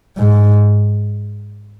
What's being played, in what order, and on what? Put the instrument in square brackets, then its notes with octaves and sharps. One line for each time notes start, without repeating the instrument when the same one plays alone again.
[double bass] G#2